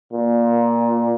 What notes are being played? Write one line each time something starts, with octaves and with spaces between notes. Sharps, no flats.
A#2